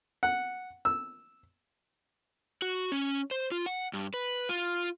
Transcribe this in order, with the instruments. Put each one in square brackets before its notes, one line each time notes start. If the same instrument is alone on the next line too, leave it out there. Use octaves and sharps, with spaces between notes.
[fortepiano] F#5
E6
[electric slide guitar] F#4
C#4
C5
F4
F#5
G2
B4
F4